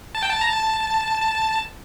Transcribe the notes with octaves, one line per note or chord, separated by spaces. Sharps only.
A5
G5
A5
A#5
A5